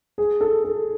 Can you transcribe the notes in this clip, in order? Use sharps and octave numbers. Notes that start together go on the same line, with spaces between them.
G#4
A4
A4